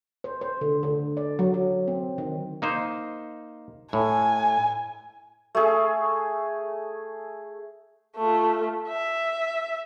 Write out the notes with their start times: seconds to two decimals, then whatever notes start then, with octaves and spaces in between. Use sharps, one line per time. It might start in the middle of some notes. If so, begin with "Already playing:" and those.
0.24 C5
0.41 C5
0.61 D3
0.83 D3
1.17 D5
1.39 F#3
1.54 F#3
1.88 C4
2.18 D#3
2.62 A#3 D#4 C5
3.93 A2 G#5
5.55 A3 G#4
8.17 A3 F4
8.88 E5